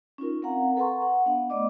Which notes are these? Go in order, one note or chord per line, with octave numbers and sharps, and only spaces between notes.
C#4 D#4 F4 A#4
C4 A#4 F5 F#5 A#5
A4 B4 F#5 A#5 C6 C#6
F#5
B3 D4 F5 F#5
A3 B3 D5 D#5 D6